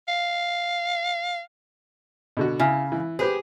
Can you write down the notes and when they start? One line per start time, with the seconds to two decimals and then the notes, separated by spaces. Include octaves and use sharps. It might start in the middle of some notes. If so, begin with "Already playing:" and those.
0.08 F5
2.37 B2 D3 F#4
2.59 C#3 E4
2.92 E3
3.19 G4 G#4 B4 C5